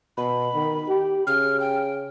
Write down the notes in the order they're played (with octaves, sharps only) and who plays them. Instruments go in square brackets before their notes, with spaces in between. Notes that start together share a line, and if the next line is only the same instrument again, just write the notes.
[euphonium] B2 [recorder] B5
[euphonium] D#3
G4
[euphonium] C#3 [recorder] F6
[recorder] G5